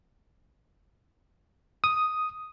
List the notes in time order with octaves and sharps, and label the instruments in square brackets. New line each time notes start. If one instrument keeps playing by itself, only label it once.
[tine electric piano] D#6